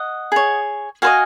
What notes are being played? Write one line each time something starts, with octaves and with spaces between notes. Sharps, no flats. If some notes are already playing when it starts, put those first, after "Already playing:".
Already playing: D#5 F#5
G#4 C#5
F#4 C5 D#5 F5 G#5